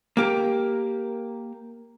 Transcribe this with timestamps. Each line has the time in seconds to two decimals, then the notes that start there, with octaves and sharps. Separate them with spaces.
0.17 A#3 G4 A#4